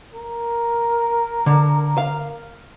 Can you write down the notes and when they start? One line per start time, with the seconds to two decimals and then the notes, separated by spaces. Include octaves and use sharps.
0.14 A#4
1.46 D3
1.98 F5